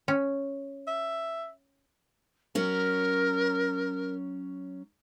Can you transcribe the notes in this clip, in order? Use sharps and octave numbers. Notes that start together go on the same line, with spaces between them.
C#4
E5
F#3 C#4 A#4